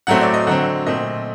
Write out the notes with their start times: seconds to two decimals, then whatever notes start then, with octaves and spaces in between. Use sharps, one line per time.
0.07 A2 F#3 A3 C4 F#5
0.21 D5
0.34 D#5
0.47 D3 F#3 C4 F#5
0.86 A#2 A3 C4 D#5